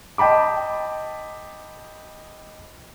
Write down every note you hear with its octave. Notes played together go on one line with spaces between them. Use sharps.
D#5 G5 A5 B5 D6